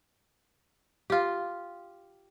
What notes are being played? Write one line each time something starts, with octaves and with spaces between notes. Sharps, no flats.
F4 G4